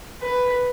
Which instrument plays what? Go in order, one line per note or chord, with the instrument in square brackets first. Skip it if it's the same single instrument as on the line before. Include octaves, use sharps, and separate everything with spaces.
[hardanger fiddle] B4